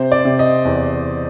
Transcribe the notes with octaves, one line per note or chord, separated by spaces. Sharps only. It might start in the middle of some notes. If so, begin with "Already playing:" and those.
Already playing: C3 C5
D5
C3
D#5
E2